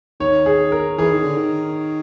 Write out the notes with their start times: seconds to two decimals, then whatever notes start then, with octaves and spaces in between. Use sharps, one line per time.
0.20 D#3 C#5
0.46 G#4
0.72 A#4
0.98 E3 G#4
1.11 D#3
1.23 D3
1.37 D#3